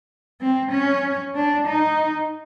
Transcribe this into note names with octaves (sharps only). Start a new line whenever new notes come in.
C4
C#4
D4
D#4